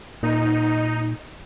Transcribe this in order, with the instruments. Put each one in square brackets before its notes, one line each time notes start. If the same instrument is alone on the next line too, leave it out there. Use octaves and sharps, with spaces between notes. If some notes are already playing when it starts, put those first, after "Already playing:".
[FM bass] A#2 [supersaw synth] D#4